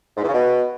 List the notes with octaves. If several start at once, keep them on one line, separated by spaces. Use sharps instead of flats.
G#2
E2
C#3
B2